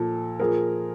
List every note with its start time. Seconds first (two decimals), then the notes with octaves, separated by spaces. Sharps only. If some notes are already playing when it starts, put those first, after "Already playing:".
Already playing: A#2 F3 A4
0.39 A#2 F3 G#4 A#4